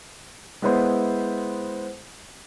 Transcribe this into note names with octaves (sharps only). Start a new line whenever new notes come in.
G#3 B3 E4 B4 C5